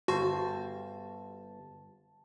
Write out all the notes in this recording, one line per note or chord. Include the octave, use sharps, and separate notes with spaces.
G1 F#4 C5 A5